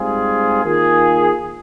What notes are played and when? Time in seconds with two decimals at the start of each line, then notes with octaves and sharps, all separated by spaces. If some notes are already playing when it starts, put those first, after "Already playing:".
Already playing: G#2 G3 C4 F4 G#4
0.64 D#3 A#3 F4 G#4